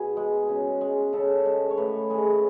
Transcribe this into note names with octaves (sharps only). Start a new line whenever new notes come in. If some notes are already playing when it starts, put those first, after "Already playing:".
Already playing: B2 G#4
G#3
C#3
G#3
C#3 A4
G#3
C#5
A2 B4
G#3 G#4